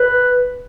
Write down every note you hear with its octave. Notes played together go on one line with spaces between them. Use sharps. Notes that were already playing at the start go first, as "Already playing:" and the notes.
Already playing: B4